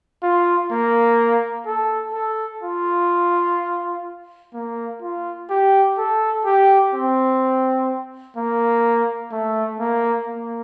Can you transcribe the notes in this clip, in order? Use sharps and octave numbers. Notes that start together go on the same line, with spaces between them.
F4
A#3
A4
A4
F4
A#3
F4
G4
A4
G4
C4
A#3
A3
A#3
A#3